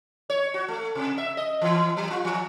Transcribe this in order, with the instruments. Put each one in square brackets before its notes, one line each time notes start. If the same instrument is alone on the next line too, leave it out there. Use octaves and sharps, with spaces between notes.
[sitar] C#5
F#4
A3
C3
E5
D#5
E3
F#3
F4
F3